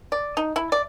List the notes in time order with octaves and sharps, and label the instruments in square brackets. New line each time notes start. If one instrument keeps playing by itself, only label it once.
[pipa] D5
D#4
E4
D5